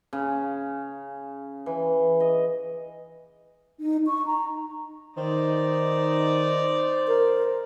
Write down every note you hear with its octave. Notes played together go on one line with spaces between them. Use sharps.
C#3
E3
D#5
D#4
C#6
A#5
D#3 D#4 C5 D5
A#4